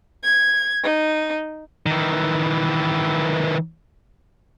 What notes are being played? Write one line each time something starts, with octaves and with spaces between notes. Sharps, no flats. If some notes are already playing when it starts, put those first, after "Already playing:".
G#6
D#4
D#3 E3